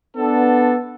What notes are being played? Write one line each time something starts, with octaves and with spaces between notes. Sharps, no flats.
B3 D4 A4